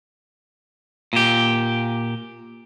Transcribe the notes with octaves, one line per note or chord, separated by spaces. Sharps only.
A#2 G4